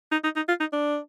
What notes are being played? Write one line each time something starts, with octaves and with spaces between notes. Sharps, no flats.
D#4
D#4
D#4
F4
D#4
D4